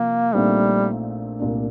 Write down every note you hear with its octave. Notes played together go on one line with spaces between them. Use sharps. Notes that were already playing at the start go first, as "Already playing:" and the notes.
Already playing: C3 F3 A#3
A#1 A#2 G3 A3 C4 D#4
C2 A#2 A3 D4